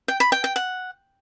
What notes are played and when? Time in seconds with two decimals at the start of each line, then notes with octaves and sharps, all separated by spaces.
0.08 G5
0.20 B5
0.32 G5
0.44 G5
0.56 F#5